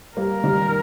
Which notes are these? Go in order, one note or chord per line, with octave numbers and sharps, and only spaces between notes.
G3 A#3 A#4
D#3 G3